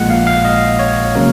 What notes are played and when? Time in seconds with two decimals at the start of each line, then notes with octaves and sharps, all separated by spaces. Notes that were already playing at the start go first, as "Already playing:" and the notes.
Already playing: A#1 A#2 G#3 F#5
0.10 F5
0.27 F5
0.45 D#5
0.79 C#5
1.15 C#3 F#3 A#3 A#4